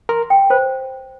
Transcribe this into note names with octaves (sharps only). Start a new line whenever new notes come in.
A#4 C6
G5
B4 C5